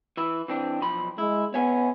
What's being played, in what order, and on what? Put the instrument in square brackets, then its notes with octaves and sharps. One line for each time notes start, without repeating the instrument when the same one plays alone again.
[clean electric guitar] E3 E4
E3 C4 D4
B1 F3 B5
[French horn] G#3 [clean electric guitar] E4
[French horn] B3 [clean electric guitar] C#5 E5 G#5